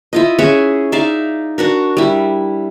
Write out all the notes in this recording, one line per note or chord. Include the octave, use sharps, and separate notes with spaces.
E4 F4 D#5
C#4 G#4 E5 F#5
D#4 D5 E5 F5
D4 F#4 A#4
G3 E4